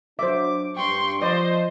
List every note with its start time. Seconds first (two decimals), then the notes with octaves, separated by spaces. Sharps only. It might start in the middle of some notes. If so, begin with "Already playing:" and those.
0.19 F#3 D4 C5 E5 D6
0.77 G2 G5 C6 C#6
1.22 F3 C5 D5 D#5 C6